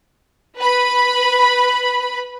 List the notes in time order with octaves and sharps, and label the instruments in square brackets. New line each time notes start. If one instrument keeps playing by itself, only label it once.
[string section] B4 B5